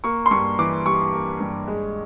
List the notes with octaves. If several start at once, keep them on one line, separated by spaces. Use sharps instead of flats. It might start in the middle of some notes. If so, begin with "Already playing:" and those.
A#3 C#6
C6
G2 C#6
E3 D6
G3 C#6
A#3
G2
G#3